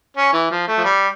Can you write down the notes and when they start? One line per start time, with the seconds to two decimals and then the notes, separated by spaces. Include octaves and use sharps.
0.17 C#4
0.33 E3
0.51 F3
0.68 A3
0.78 F3
0.84 G3